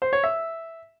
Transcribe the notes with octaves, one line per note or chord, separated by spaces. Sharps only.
C5
C#5
E5